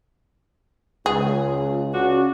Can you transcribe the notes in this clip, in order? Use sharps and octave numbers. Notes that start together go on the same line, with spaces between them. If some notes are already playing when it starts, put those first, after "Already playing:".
C#2 F4 G#4
C#3 C#4 D4 F#4